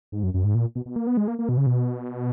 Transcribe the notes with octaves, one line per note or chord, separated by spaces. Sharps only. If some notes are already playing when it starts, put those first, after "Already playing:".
G#2
F#2
F#2
G#2
A#2
B2
B2
A#3
B3
G#3
A#3
A#3
B2
C#3
B2